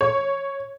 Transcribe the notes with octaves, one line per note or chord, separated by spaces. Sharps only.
C#5